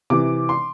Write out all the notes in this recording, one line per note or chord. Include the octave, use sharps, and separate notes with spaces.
C3 E3 D6
C6